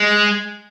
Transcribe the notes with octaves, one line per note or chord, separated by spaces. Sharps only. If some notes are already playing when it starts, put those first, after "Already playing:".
Already playing: G#3